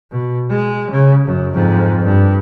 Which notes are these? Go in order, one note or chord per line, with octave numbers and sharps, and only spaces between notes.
B2
G#3
C#3
F#2
F2 G#2
G2